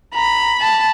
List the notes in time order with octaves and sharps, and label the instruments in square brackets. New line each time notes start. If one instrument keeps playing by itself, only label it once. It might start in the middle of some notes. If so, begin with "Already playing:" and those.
[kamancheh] A#5 [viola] B5
[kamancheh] A5